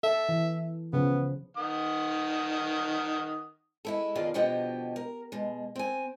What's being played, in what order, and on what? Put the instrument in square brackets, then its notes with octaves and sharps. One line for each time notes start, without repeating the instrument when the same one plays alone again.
[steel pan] A4 [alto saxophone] E5
[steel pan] E3
[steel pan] C#3 F3 [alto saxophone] B3
[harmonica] D#3 F#5 D#6
[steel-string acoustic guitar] G#3 E4 A4
F2 B2 D#3 F4 G#4 D5
B2 D3 F3 F#4 G4 D#5
A#4
B2 G#3
C4 G#5